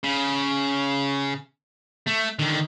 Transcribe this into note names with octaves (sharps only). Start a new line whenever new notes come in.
C#3
A3
D3 D#3